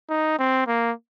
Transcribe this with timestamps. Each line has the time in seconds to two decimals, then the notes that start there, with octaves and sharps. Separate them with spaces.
0.09 D#4
0.39 C4
0.67 A#3